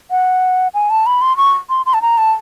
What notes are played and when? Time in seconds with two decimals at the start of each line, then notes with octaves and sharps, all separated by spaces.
0.11 F#5
0.74 G#5
0.90 A5
1.06 B5
1.22 C6
1.37 C#6
1.70 C6
1.86 C6
1.94 A5
2.02 A#5
2.18 A5